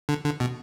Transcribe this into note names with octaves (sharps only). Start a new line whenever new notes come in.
D3
D3
B2